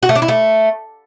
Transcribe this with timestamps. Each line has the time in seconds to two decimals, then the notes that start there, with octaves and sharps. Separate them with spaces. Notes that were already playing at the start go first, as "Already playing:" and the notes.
0.03 F#4
0.09 A3
0.15 D4
0.22 E4
0.28 A3